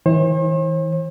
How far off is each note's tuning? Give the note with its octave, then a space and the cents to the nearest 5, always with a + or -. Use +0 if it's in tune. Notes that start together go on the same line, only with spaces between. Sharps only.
E3 -40 C5 +45